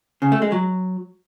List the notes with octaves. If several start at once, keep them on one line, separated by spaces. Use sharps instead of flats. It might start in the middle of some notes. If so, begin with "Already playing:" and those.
C#3
A3
G#3
F#3